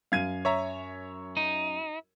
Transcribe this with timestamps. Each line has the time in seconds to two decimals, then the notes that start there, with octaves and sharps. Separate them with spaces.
0.12 F#2 F5 G#6 D#7
0.45 C#5 E5 A#5
1.37 D#4